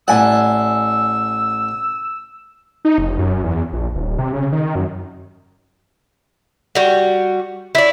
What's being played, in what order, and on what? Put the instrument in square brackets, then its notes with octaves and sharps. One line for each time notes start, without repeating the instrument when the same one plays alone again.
[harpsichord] A1 F#5 [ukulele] D5 G#5 [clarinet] E6
[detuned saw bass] D#4
F1
F#2
E2
A#1
D#1
C3
C#3
D#3
F#2
[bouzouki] G3 F#4
E4 D5